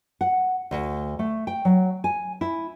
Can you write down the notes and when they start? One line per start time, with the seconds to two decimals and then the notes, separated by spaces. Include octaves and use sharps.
0.21 F#5
0.71 D2
1.19 A3
1.47 G5
1.65 F#3
2.04 G#5
2.41 E4